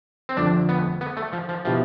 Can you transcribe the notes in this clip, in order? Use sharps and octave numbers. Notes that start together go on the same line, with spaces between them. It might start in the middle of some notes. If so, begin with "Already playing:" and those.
C4
G1 F2 D3 F3 A3 D4
B3
B3
A3
F3
F3
B2 F3 B3 E4 G4